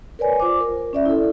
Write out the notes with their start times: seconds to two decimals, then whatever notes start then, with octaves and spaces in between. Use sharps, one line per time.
0.19 A#4 B4 C#5 D5 G#5
0.40 F4 C5 D6
0.60 A#4
0.93 C#4 D5 E5
1.05 E4 A4